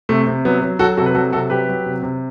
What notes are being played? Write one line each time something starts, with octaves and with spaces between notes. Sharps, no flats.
C3 A3
C3
F#3 B3
F#3
F#3 F#4 A4
C3 F#4 A4
B4
F#3 F#4 A4
C3 F#4 A4
F#3 G4 B4
F#3
C3
C3